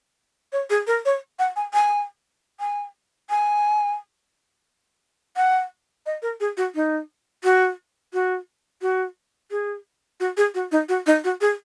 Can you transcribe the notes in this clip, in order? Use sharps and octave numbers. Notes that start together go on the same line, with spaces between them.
C#5
G#4
A#4
C#5
F#5
G#5
G#5
G#5
G#5
F#5
D#5
A#4
G#4
F#4
D#4
F#4
F#4
F#4
G#4
F#4
G#4
F#4
D#4
F#4
D#4
F#4
G#4